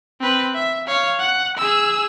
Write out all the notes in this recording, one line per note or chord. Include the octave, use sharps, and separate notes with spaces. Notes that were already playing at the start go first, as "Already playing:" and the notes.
C4 B4
E5
C#5 F5
F#5
G#4 E6